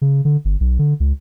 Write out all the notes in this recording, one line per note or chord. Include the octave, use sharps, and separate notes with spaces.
C#3
D3
G1
B1
D3
C#2